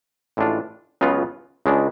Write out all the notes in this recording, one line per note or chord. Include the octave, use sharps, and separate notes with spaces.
A1 A2 G#3 D4 F4
C#2 C#3 F#3 B3 F4
C#2 C#3 G#3 D4